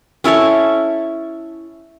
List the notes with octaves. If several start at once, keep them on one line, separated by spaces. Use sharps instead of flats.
C#4 E4 A4 C#5